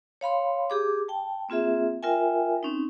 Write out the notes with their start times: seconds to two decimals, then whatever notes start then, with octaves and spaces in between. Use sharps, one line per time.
0.21 C#5 F5 B5 C6
0.70 G4 G#4 D6
1.08 G5 A5
1.49 A#3 C4 F4 G#4 E5
2.03 F4 A#4 E5 G5 G#5
2.63 C4 C#4 D#4